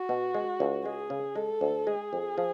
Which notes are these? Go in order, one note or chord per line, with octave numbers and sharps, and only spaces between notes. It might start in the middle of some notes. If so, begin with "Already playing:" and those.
Already playing: F#4
B2
G#3
C#2
G#3 G#4
C#3
G#3 A4
D2
G#3 G#4
F2
F3